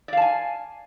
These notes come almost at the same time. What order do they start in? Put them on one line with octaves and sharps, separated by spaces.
D5 F5 A5 G#5